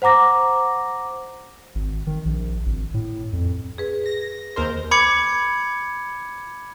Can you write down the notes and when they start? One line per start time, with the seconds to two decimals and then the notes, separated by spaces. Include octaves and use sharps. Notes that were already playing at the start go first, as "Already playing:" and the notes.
0.02 C5 F#5 A#5 D6 A#6
1.75 G#1
2.07 D#3
2.25 A#1
2.66 G#1
2.94 A2
3.33 F2
3.78 G#4 B4
4.06 A#6
4.56 D#2 A#4 C5
4.91 B5 D6 G#6 C#7